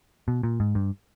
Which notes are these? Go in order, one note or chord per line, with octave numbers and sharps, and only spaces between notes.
B2
A#2
G#2
G2